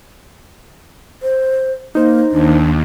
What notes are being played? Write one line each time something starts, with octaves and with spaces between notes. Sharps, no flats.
C5
A#3 D#4 C5
D#2 D4